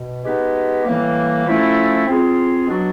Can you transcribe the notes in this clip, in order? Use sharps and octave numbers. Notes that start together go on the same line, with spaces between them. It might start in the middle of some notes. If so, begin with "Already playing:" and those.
Already playing: B2
G#3 B3 D#4 G4 B4
A2 E3 G3 A#3
F3 A3 C#4 E4 A4
C4 F4 G#4
B2 F#3 B3 D4 F#4